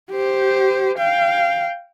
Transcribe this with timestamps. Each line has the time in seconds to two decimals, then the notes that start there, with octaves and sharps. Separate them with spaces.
0.11 G4 C5
0.98 F5 G5